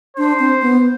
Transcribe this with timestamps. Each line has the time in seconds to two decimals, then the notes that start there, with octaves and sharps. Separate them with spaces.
0.17 D4 C5
0.39 C4
0.61 B3